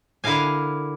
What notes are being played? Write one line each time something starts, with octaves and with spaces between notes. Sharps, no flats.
D3 E4 A#4 F5 G#5